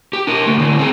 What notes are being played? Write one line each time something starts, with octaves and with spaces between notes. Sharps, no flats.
G4
D4 A#4
D2 A3
A2 D3
C4 G#4